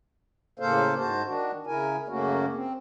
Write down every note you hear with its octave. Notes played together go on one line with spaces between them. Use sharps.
A2 C#3 A#3 A4 C5 F5
G#2 F#4 C5 A5
D#3 D4 F#4
C#3 E4 A#4 G#5
F#2 C#3 A3 A#3 C#4 F#4
C4